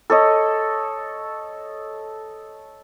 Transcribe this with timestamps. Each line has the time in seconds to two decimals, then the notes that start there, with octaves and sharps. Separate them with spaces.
0.10 A4 C#5 D#5